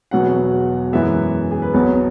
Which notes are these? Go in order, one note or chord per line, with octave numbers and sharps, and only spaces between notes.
E1 E2 B2 F#3 B3 F#5
F#2 E3 G#3 B3 E5
G#4
B4
B1 B2 B3 C#5